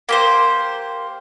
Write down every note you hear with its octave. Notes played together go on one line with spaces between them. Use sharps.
A#3 G4 C5